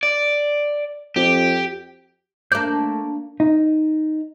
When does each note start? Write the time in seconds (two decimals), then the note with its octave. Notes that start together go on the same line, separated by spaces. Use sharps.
0.03 D5
1.16 F2 G4
2.52 A#3 D4 G6
2.67 A3
3.40 D#4